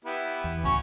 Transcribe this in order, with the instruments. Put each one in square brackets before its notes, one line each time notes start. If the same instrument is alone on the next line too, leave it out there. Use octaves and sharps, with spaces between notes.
[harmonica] B3 E4 G4
[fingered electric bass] E2
[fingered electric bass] C#2 A2 [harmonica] C#4 F#4 C#5